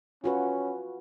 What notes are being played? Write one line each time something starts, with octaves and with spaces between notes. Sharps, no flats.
C#4 F4 F#4 B4